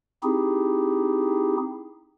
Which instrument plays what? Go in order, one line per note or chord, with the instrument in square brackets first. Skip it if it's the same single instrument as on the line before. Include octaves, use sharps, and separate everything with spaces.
[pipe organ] C4 D#4 E4 G4 G#4